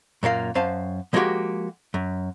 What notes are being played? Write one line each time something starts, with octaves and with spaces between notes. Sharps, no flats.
F#2 A#2 A#3 F5
F#2 C5 F5 A5
F3 G#3 A#3 B3 F#4 G4
F#2